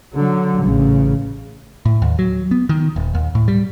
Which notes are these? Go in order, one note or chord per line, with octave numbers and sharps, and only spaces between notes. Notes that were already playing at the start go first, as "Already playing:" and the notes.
D3 F#3
A1 C#3
A2
D#2
F#3
B3
D#3
D#1
D#2
A2
G3